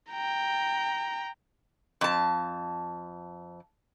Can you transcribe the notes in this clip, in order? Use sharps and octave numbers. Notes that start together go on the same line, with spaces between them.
G5 A#5
F2 A5